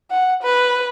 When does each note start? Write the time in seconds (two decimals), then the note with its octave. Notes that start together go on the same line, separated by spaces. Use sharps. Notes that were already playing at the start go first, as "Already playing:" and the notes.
0.11 F#5
0.43 B4